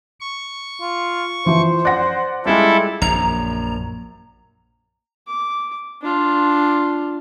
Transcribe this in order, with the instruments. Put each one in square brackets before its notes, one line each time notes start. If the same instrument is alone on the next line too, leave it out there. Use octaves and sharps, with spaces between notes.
[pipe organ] C#6
[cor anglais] F4
[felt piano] E3 F3 [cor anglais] C5
[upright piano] D5 F#5 [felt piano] F#6 A#6
[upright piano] G3 G#3 [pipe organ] E4 A4 [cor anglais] F4
[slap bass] A#1 F#2 [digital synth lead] A#5
[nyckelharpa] D6
D4 F4